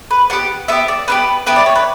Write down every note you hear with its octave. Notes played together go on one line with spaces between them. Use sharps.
B4
B3 D4 G4 F#5
B3 E4 G4 E5
D5
B3 E4 G4 B4
B3 E4 G4 B4
D5
C#5
B4